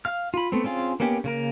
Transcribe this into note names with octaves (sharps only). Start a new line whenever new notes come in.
F5 F6
F4 B5
A3 B3 C4
C4 C#4 F4 G#4
A#3 B3 C#4 G4
C#3 A#3 A#4